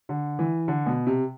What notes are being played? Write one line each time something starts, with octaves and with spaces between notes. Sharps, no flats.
D3
E3
D3
B2
C3